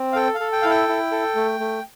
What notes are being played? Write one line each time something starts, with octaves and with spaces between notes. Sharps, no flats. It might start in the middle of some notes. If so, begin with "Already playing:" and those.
Already playing: C4
F5
A4 G5
F5
A4
G5
E4 F5
G5
E4
A4
A3
A3